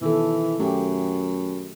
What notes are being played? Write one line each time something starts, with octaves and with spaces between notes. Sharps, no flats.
B2 D#3 E3 A4
F#2 A3 G4